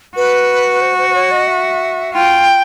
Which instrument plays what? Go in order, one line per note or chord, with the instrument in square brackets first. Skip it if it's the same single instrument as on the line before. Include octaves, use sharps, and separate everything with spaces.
[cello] F#4 [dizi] B4
[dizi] C5
C5
C5
C#5
D#5
E5
[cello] F4 [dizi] G5